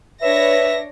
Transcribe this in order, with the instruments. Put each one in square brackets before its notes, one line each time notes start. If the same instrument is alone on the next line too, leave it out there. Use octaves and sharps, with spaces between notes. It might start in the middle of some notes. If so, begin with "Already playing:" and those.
[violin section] D4 C#5 A#6 [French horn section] B4 [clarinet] E5